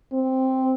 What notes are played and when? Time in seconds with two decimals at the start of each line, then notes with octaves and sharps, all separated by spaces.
0.13 C4